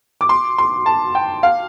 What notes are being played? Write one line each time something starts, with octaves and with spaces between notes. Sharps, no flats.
D6
C6
C6
A5
G5
F5